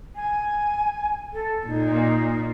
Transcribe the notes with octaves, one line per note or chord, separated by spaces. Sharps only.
G#5
A4
A#2 D#4